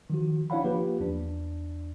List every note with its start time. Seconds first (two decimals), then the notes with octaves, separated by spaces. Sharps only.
0.10 D#3 F3 F#4
0.50 D4 E4 C#5 F5 F#5 B5
0.64 F3 A#3 F4 G4 B4
1.00 E2 D4